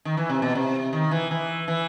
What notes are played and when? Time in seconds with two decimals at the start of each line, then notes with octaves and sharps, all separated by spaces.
0.05 D#3
0.17 E3
0.29 C3
0.42 B2
0.55 C3
0.93 D#3
1.11 E3
1.31 E3
1.68 E3